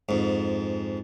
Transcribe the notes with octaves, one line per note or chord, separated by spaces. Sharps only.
F2 G#2